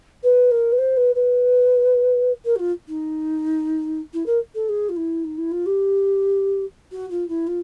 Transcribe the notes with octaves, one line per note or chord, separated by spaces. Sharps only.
B4
A#4
B4
C5
B4
B4
A#4
F#4
F4
D#4
E4
A#4
A4
G#4
F4
E4
D#4
E4
F4
G4
F#4
F4
E4
F4